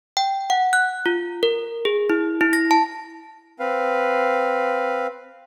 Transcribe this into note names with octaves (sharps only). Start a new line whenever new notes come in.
G5
F#5
F#6
F4
A#4
G#4
E4
E4
A#6
A5
C4 B4 F5